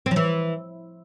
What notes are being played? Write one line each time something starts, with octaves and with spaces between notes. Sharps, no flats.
C4
F3
E3